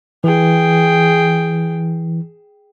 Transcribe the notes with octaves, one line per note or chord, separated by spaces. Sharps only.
E3 G#4 G5